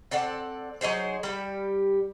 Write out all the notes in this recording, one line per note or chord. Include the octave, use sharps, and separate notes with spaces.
C4 A4 D5 F#5
F#3 D#4 G#4 C5
G3 G4